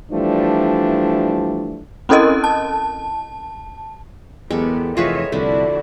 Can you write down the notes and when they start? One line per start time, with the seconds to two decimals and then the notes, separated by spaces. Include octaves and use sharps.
0.12 E3 F3 G3 A3 D4
2.09 C4 C#4 E4 A4 A#4 D#5
2.44 A5
4.51 E2 F#3 G#3 A#3 B3 G4 A4
4.97 F1 E3 F4 G#4 B4 C#5 D#5 E5
5.32 C2 D3 F3 A3 D4 E4 F#4